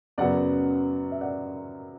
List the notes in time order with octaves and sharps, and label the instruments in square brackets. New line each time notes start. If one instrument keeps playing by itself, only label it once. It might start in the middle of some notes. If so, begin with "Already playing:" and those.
[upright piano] F#2 C#3 F#3 B3 D5 F#5
E5
D5 F#5